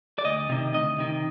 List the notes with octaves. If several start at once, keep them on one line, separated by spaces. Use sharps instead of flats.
D5
D2 D#5
C3 D#3
D2 D#5
C3 D#3